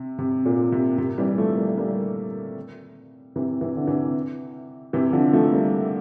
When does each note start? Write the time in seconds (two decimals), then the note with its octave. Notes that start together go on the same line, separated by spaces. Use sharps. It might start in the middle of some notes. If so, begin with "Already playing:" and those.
Already playing: C3
0.19 C3
0.46 A#2
0.72 C3
0.98 C3
1.18 E3 G3
1.38 F3 A3
1.57 G3 A#3
1.78 G3 A#3
3.36 C3 E3
3.61 C3 E3
3.77 D3
3.87 C3 E3
4.93 C3 E3
5.12 D3 F3
5.33 F3 A3
5.52 G3 A#3